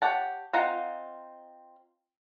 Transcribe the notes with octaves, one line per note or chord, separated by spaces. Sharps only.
G4 C#5 F#5 A5
C4 D#4 F4 F#5 A#5